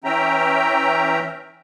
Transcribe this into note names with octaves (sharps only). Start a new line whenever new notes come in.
E3 C#4 E5 G5 A#5